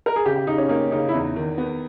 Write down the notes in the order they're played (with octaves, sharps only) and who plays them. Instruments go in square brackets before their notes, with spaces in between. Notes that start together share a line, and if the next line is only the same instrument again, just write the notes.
[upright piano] A#4
G#4
[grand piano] C#3 [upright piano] G4
[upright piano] G4
[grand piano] C#3 [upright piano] D#4
[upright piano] C#4
[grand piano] A#3 [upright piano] D#4
[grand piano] C#3 [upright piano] D#4
[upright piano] E4
[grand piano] E2 [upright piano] D#4
[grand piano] D#3
B3